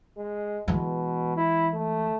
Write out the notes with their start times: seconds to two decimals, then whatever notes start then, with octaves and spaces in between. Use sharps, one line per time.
0.17 G#3
0.68 B2 E3 G#3
1.37 E4
1.74 A3